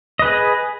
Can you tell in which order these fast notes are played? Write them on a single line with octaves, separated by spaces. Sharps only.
D#5 B4 G#4